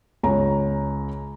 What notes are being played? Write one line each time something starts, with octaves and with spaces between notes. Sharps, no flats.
C#2 C#5 A#5